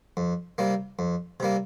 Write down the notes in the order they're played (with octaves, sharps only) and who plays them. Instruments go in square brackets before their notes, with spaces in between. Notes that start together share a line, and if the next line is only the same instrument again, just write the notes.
[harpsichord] F2
C3 G3 A#3
F2
C3 G3 A#3